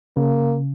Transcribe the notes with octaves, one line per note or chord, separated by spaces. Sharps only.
C#3 A#3